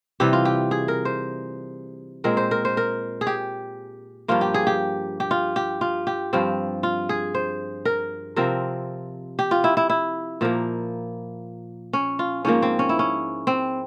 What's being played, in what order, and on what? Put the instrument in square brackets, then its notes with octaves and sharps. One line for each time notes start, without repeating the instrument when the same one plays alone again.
[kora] C3 E3 G3 G4
F4
G4
G#4
A#4
C5
A#2 G#3 C4 A#4
C5
A#4
C5
A#4
G#4
G4
G2 F3 A#3 F4
G4
G#4
G4
G4
F4
G4
F4
G4
G2 F3 C4
F4
G#4
C5
A#4
C3 F3 C4 A#4
G4
F4
E4
E4
E4
A#2 F3 A#3
C#4
F4
G#2 F3 A#3 C#4
C4
C#4
E4
C#4
C4